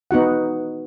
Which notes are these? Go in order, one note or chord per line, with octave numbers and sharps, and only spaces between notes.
B3 D#4 F#4 F#5